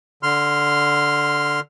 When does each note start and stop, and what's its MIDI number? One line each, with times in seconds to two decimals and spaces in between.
0.23 1.60 50
0.23 1.60 84
0.23 1.60 89